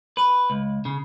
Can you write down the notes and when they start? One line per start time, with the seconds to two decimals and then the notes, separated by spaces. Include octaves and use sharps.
0.17 B4
0.50 C#2
0.85 C#3